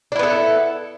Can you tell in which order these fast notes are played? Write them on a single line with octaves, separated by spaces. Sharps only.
D4 E4 B3 A4